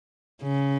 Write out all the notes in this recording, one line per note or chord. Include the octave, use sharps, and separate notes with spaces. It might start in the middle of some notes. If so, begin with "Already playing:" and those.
C#3